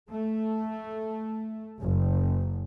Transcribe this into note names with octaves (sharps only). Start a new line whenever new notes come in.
A3
F#1